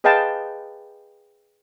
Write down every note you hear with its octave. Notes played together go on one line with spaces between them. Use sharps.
G#4 B4 D#5 F5 G5 A5